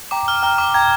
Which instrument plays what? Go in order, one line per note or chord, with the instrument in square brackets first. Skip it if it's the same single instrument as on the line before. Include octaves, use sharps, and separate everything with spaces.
[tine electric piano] G5 A#5 [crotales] D6
[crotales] F6
[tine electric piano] G5 A#5 [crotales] F6
[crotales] D6
[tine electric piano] G5 A#5 [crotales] G#6